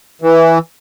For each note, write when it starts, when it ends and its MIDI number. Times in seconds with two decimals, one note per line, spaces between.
0.22 0.58 52